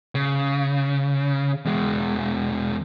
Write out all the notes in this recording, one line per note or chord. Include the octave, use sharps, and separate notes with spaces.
C#3
E2 G#3